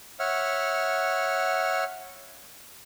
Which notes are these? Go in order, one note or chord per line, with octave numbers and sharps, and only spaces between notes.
C#5 E5 F#5 F6